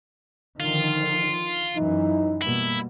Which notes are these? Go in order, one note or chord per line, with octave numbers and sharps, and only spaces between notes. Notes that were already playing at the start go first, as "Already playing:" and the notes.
D3 D#3 F3 F4
F#2 E3 D#4
B2 G3 A#3 E4